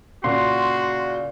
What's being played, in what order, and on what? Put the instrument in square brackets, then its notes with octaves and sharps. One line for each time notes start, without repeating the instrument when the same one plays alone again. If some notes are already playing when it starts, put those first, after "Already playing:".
[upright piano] A#2 C#3 [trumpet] F#4 [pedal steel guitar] C6